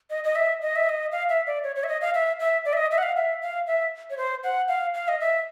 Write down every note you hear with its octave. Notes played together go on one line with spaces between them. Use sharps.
D#5
D#5
E5
D#5
E5
D#5
F5
E5
D5
C#5
C#5
E5
D#5
F5
E5
E5
D5
E5
D#5
E5
F#5
F5
E5
F5
E5
C#5
C5
F#5
F5
F5
D#5
E5